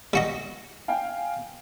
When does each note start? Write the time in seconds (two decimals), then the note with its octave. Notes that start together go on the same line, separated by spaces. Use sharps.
0.13 G3 F#4 D#5
0.88 F5 G5 G#5